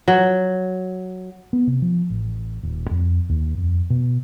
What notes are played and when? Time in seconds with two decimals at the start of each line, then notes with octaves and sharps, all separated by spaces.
0.08 F#3
1.53 B3
1.67 C3
1.82 F3
2.10 A1
2.63 D#1
2.91 F2
3.29 D#2
3.58 F2
3.90 B2